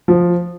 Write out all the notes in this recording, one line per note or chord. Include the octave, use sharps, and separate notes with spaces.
F3